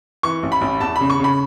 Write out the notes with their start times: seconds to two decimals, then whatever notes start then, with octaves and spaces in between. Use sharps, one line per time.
0.23 E3 C#6
0.43 A1
0.52 B5
0.61 A1
0.80 E2 A5
0.96 C#3 B5
1.10 C#6
1.19 C#3 B5